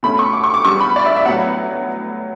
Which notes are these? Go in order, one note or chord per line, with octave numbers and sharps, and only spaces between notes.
B2 A3 C#4 B5
C#6
D6
C#6
D6
C#3 G3 B3 C#6
B5
D5
E5
E5
A2 F#3 B3 F#5